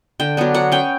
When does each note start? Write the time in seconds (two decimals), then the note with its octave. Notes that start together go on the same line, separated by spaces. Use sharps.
0.20 D3 G5
0.37 F#3 B3 D4
0.54 F#3 F#5
0.72 C#4 G5